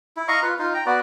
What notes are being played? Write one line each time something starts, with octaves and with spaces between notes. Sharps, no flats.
E4
D#5 F5 A#5 C#6
F4 B4
D#4 F4
G5 A#5
B3 F#4 B4 D5